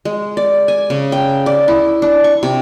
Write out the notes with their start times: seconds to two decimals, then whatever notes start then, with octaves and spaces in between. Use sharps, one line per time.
0.05 G#3
0.37 D5
0.68 G#5
0.90 C#3
1.12 G5
1.46 D5
1.68 E4
2.02 D4
2.24 C#6
2.43 C3